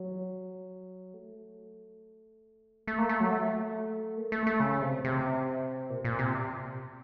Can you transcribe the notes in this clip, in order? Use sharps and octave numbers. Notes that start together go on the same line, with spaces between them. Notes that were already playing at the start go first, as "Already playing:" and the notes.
Already playing: F#3
A3
A3
A#3
A3
F#3
A3
A#3
A3
A3
C#3
C3
C3
A#2
A#2
C3